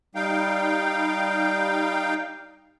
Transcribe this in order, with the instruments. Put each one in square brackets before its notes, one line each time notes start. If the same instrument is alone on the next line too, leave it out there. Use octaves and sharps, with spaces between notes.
[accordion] G3 D#4 F5 G5